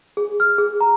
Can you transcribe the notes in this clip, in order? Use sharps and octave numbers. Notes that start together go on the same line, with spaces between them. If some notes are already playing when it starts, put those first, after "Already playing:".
G#4
F6
G#4
A#5